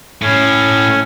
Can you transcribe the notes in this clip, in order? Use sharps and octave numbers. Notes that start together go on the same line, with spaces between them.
A2 C#4